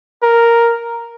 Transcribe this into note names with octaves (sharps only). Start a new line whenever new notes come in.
A#4